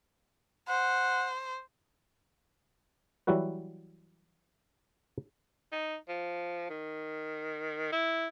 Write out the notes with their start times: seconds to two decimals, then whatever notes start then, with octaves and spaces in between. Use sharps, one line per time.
0.68 C5 F#5
3.27 E3 F#3 G3 E4 F#4 B4
5.72 D#4
6.09 F3
6.70 D#3
7.92 E4